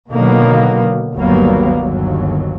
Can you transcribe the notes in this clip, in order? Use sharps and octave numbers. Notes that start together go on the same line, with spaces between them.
B2 D3 D#3 F#3 A#3 B3
G1 D#2 F#3 G3 A#3 B3
G1 D#2 F#3